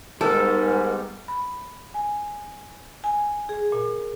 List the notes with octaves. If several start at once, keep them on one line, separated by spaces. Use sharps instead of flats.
G#2 G3 B3 A4 A#4
B5
G#5
G#5
G#4
A#2